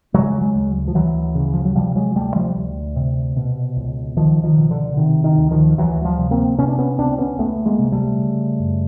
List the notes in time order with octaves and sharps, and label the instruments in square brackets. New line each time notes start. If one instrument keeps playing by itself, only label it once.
[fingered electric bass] C#3 F#3 G#3
F#3 G#3
D2
F3
D2 E3 F#3
C#3
F3
F#3
C3 F3 G3
F#3 G#3
D2 G3 A3
F3 G3
D2
C3
B2
C#2
C#2 D#3 F3
D#3 F3
B2
D3
C3 D#3
D#3
D2
D#3 F3
D2 E3 F#3
F3 G3
C3
A#3 C4
C3 B3 C#4
D4
B3 C#4
C#2 C4 D4
B3 C#4
C#2 A3 B3
G#3 A#3
C3
G3 A3
C#3
F#2